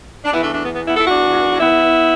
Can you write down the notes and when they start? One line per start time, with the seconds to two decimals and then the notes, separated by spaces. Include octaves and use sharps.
0.25 D4
0.32 E2 E3 B3 E4
0.43 A3 D4
0.54 A3 D4
0.65 B3
0.75 B3
0.85 B3 E4
0.96 E4 A4
1.07 D4 F#4
1.60 B3 E4